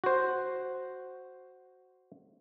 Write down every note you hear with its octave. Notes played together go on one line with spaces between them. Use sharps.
F#4 C5